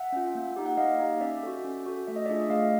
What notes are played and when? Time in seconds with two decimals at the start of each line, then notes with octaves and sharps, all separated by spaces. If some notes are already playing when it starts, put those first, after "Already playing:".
Already playing: E5 F#5
0.12 C#4 F4
0.35 A#3
0.56 D#4 G4
0.66 F#5
0.77 A#3 D#5 F5
0.99 D#4 G4
1.20 C#4 D5 E5
1.43 F#4 A4
1.64 C#4
1.86 F#4 A4
2.08 A3 E5
2.16 D#5
2.26 D4 F4 G#4 D5 E5
2.50 A3 D#5 F5